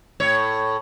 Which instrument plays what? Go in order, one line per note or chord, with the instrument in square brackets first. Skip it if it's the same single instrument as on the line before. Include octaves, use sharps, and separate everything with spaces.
[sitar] A2 C#5